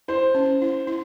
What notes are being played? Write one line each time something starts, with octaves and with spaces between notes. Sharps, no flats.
E4 C5
C#4
E4
E4